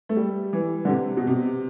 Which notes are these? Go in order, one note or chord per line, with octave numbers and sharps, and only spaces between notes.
A3
G3
E3
D3
C3
B2
C3